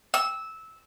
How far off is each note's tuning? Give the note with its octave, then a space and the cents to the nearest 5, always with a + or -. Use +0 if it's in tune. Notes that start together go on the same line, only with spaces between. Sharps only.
E6 -15